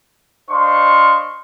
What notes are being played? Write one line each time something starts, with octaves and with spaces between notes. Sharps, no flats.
D4 C5 D#5 F5 C6 C#6